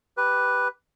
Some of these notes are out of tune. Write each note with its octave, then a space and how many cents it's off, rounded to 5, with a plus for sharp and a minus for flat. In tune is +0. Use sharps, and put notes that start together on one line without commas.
G4 +0 B4 +0